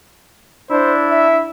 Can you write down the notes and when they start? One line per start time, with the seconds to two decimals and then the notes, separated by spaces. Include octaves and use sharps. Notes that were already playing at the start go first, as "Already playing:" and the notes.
0.70 D4 E4 C5
1.09 E5